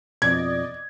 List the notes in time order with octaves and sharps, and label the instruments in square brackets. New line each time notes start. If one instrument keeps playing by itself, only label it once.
[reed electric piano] F2 B2 [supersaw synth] D5 D#5 [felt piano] G#6